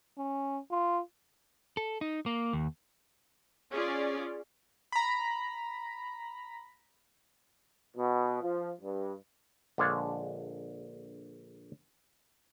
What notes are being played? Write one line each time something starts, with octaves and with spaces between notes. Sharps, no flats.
C#4
F4
A4
D#4
A#3
D#2
C#4 F4 G#4 D5
A#5 B5
B2
F3
G2
A#1 D3 G#3 D4 F4 C#5